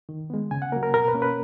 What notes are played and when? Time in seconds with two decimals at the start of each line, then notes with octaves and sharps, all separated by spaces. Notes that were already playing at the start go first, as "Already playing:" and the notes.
0.09 D#3
0.30 G#3 B3
0.51 C#3 G#5
0.62 F#5
0.72 A#3 A#4
0.76 F#3
0.83 A#4
0.94 B2 A#4
1.08 B4
1.15 A#3 C#4
1.22 B4